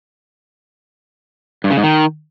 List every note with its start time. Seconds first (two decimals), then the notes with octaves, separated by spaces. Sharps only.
1.64 G2
1.71 C#3
1.77 G#2
1.83 D#3